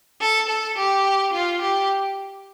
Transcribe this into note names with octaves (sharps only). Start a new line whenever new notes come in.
A4
A4
G4
F4
G4